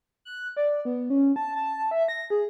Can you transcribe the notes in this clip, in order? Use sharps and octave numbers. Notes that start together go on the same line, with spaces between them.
F#6
D5
B3
C#4
A5
A5
E5
A#6
G#4